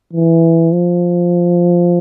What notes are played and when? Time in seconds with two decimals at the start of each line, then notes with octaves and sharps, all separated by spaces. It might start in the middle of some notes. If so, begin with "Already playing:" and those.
0.13 E3
0.72 F3